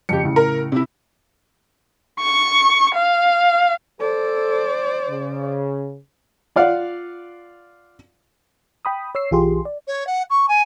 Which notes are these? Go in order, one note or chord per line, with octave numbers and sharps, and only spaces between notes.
F2 C#3 G4 C#7
A2 C#3
A#4
C3 E4
C#6
F5
A4 C5 D5
C#3
F4 D5 F5 F#5
G5 B5 D#6
C#5 E6 C7
B1 E3 F4 G4 G#4 C6
D5
C#5
F#5
C#6
G#5